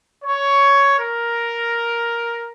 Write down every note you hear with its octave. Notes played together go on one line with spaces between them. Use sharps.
C#5
A#4